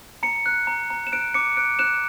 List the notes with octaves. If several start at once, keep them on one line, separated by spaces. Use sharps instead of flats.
A#5 C#7
F#6
A#5
A#5
E7
F#6 D7
D6 C#7
F#6 D7
F#6 E7